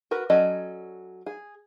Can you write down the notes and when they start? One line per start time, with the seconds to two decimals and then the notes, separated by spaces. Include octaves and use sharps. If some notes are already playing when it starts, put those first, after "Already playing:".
0.11 F#4 A#4 B4
0.30 F#3 C#4 A4 D5 D#5
1.26 G#4